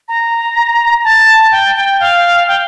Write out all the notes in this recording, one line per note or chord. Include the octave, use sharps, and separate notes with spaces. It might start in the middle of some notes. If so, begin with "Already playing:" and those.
A#5
A5
G5
G5
F5
G5